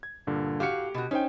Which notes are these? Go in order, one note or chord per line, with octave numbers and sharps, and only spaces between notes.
G#6
G2 A#2 D3
A2 F#4 G4 F5 C#7
B2 F#4
C#4 D#4 C5 G5